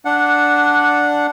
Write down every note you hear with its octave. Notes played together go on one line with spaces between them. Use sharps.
D4 F#5